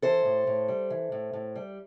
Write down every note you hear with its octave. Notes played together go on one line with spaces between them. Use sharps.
E3 A4 C5
A2
A2
G3
E3
A2
A2
G3